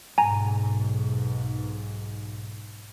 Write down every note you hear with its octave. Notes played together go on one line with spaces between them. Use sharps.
B1 G#2 G#5 A#5